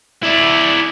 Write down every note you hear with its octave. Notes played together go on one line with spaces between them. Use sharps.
E4 D5